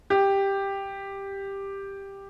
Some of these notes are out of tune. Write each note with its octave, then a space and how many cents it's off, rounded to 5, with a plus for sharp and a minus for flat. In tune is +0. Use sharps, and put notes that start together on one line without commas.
G4 +5